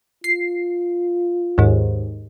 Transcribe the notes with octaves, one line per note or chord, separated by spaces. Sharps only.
F4 C7
D#2 G#2